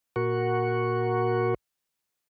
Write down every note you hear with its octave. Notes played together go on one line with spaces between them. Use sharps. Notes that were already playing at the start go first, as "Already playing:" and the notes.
A#2 F#4 A#4 F#5 C#6